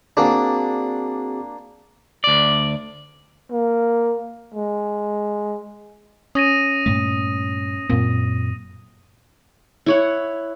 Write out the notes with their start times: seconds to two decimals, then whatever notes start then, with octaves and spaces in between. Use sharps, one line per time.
0.17 A#3 C4 D4 F#4 G#4
2.24 D2 D5
3.51 A#3
4.55 G#3
6.35 C#4 D#6 A#6 D#7
6.86 G2 A#2 A3
7.90 F#2 A#2 C4
9.86 E4 C#5 F#5